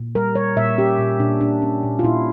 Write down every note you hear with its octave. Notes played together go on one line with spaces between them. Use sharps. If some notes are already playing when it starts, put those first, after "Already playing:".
Already playing: A#2
G3 A#4
G3 C#5
A#2 E5
C#4 G4
A#2
A#2 D4
A#2 D4
C#4
A#2
F4
A#2 E4